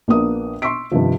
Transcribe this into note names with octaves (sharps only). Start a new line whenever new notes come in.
A#1 A#3 B3 D4 A#4 D#6
C6 C#6 E6 B6 D7
G2 C3 D#3 F3